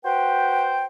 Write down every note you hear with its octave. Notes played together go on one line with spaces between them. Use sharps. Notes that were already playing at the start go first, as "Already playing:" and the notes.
F#4 B4 C5 G5